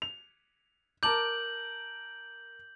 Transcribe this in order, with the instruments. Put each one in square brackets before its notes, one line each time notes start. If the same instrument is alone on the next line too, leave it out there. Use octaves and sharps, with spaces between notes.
[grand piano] F7
[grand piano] A#4 A5 D6 [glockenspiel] G6 F#7